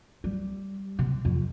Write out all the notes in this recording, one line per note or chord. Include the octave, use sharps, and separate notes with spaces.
G3
C3
F2